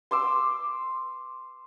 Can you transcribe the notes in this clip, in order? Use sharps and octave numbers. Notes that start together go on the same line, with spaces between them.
C6 D6 E6